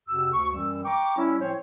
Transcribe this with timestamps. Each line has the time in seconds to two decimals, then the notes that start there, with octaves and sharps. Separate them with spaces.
0.08 F2 C3 F#4 E6
0.32 D2 C#6
0.52 F#2 E3 G3 E6
0.84 G5 A#5 C#6 D6
1.17 G3 C#4 E4
1.40 A2 F3 C4 C5 C#5